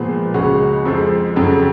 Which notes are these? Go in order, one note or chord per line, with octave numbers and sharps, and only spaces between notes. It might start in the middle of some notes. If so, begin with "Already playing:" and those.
Already playing: A#2 F3 G#3 B3
C#2 C#3 G#3 C#4 F#4
F2 F3 G#3
F2 C#3 F#3